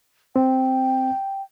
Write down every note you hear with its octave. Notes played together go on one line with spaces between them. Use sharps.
C4 G5